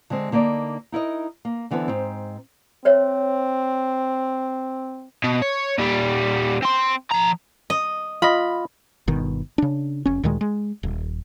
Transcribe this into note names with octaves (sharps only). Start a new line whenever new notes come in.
D3 G#3 C4
D3 A#3 D#4 D5
D#4 E4 A#4 D#5
A#3
D3 E3 B3 C4 A4
G#2 C4
C4 C5 C#5 E5
B2
C#5
A#2 G3
C4 C6
F3 A#5
D#5
F4 D#5 B5
G1 B2 D#3
C#3 D4
F1 C#4
D2 A#2 D#3 G#3
G#3
D#1